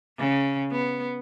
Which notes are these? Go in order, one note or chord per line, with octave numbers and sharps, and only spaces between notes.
C#3
B3